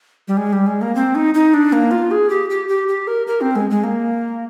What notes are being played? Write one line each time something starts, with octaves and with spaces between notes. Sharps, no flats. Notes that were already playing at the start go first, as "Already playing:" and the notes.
G3
G#3
G3
G#3
A#3
C4
D#4
D#4
D4
A#3
F4
G#4
G4
G4
G4
G4
A#4
A#4
C4
G#3
G#3
A#3